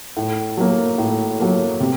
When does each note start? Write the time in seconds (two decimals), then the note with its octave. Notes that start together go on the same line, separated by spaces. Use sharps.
0.17 A2
0.57 F#3 A#3
0.98 A2
1.40 F#3 A#3
1.80 C3